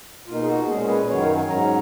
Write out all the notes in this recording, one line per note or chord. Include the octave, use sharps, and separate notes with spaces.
B2 A#3 D#4 F4
G#4
F#4
A#2 G#3 C#4 G#4
B4
F#2 D#3 F#3 C#5
F5
G#5
G#2 F#3 C#4 A#5